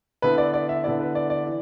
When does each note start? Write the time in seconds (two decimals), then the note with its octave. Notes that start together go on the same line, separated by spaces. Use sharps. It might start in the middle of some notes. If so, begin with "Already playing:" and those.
0.22 D3 B3 E4 B4
0.38 D5
0.54 D5
0.69 E5
0.84 D3 B3 E4 D5
1.00 B4
1.15 D5
1.30 D5
1.47 E3